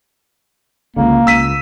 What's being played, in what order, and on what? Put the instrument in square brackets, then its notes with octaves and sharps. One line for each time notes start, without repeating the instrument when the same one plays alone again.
[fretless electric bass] C#2 D3 [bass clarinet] A#3
[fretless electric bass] C#2 [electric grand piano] E6 B6 D#7